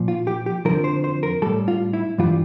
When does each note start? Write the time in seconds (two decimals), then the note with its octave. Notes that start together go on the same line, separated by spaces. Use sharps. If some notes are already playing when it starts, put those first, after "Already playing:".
Already playing: A#2 F3
0.08 F4
0.27 G4
0.46 G4
0.65 F2 D3 F3 A#4
0.84 C5
1.04 C5
1.23 A#4
1.42 A2 G3 A4
1.68 F4
1.93 E4
2.18 G2 E3 G3 F4